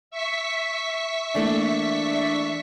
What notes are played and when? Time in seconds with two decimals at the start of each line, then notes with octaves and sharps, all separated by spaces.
0.11 E5 C#6 B6
1.35 E3 A3 A#3 D4